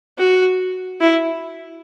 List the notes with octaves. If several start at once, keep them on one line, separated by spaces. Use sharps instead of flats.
F#4
E4